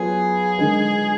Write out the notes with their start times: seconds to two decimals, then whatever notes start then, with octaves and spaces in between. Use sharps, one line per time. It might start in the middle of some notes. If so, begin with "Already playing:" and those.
Already playing: F#3 B3 F4 G#4
0.58 D3 G#3 D#4 A#4